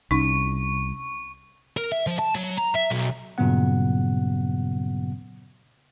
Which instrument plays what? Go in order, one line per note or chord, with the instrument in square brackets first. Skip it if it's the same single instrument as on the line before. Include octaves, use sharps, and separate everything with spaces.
[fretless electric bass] C2 [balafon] C#4 D#4 [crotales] C#6
[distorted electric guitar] A#4
E5
F3
A5
F#3
A#5
E5
B1
[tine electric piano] G2 A#2 C#3 F#3 B3 F#5